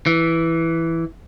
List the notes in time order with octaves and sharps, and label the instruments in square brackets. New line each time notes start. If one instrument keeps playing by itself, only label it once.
[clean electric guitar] E3